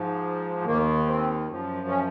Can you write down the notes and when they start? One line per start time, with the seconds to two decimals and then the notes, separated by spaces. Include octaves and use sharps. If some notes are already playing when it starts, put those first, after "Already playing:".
Already playing: G#2 F3
0.66 D#2 D#3 A#3
1.06 C4
1.48 F#2 F3
1.88 C#4